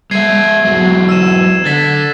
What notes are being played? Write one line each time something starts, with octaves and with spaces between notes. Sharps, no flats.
G#3 E5 G#6 C7 D#7
E2 F#3
E6 D#7 E7
D3 A6 B6